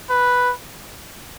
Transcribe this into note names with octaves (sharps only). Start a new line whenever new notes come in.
B4